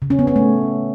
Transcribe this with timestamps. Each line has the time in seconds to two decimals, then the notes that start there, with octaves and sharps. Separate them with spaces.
0.02 C#3
0.10 C#4
0.19 B3
0.27 C#4
0.36 A3